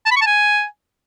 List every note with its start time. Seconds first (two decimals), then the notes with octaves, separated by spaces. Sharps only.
0.06 A5
0.11 B5
0.16 C#6
0.21 A5
0.26 G#5